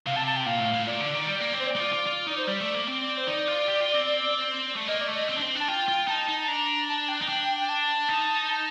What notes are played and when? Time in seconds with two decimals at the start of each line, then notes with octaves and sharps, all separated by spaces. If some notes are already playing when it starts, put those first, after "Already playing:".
0.06 C3 F5
0.16 A5
0.27 A5
0.36 G5
0.46 A#2 F5
0.60 A2
0.74 A2
0.86 A#2 D5
1.00 D3
1.13 D#3
1.26 G3
1.40 A#3
1.53 C4
1.59 C5
1.67 D5
1.76 D#4
1.80 F4
1.94 F4
2.07 F4
2.27 D#4
2.37 C5
2.48 G3 D5
2.60 A3
2.74 A#3
2.87 C4
3.17 C5
3.27 D#4 D5
3.48 F4
3.67 G4
3.81 F4
3.95 C4
4.76 A3
4.88 A#3 D#5
5.01 D5
5.08 A3
5.15 D#5
5.28 C4
5.36 D4
5.42 C4
5.55 D4 A5
5.68 F4 G5
5.88 F4
6.08 D#4 A5
6.28 D#4
6.40 A5
6.48 D4 A#5
6.89 A5
7.08 G5
7.21 D#4
7.29 D4
7.61 G5
7.69 A5
8.09 D#4
8.49 A5